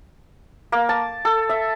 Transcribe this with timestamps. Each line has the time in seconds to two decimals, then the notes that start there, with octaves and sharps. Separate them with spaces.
0.72 A#3
0.89 A5
1.25 A4
1.49 E5